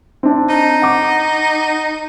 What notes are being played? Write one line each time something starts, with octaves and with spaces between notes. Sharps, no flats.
C4 D4
D#4
F#5 D6